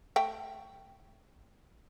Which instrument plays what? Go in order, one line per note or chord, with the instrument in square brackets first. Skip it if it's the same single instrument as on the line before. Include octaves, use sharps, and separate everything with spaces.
[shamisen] A3 E5 G5